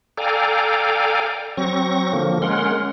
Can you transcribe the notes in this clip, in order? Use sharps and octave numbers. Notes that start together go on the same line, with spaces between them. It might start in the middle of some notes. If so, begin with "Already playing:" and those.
A4 D5 F5 G5 G#5 A#5
F#3 C4 C#6 A#6
D3 F3 A#3
G#3 C#4 A#4 F#5 C6